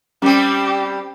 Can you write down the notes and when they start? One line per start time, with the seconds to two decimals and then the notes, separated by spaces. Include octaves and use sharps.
0.22 G3 C4 C#4 G4